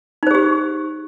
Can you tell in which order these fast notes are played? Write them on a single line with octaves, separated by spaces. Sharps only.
D#4 C5 G#4 G4